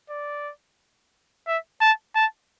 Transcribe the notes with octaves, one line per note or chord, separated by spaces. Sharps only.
D5
E5
A5
A5